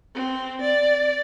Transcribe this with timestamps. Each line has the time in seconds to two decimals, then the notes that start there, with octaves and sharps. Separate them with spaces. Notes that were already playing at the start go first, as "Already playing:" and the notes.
0.14 C4
0.61 D5